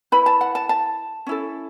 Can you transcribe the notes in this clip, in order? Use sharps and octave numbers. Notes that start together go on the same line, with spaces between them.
E4 B4 B5
A5
F#5
A5
A5
C#4 E4 A4